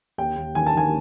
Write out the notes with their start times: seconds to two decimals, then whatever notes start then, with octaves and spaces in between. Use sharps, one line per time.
0.18 D#2 G5
0.36 D#2
0.55 D#3 G#5
0.66 A5
0.75 D#3 G#5